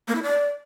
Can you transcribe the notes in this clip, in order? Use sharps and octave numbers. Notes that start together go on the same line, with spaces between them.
A#3
E4
D5